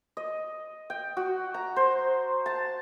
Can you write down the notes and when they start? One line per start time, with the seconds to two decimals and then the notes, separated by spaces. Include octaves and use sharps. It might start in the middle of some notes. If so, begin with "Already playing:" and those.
0.17 D#5
0.90 G5
1.17 F#4
1.54 A#5
1.76 C5
2.46 A5